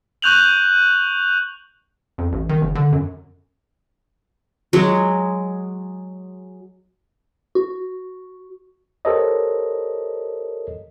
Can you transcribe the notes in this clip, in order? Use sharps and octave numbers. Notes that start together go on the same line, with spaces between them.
C#6 F#6 G6 F7 F#7
F2
A1
D#3
F#1
D3
F#2
F#3 G#3
F#4
G4 A4 A#4 C5 C#5 D#5